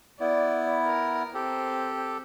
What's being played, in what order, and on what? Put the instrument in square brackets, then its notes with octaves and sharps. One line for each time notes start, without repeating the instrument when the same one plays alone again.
[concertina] B3 E4 [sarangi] D5
[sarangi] A#4
[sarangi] C4 [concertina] G4 A4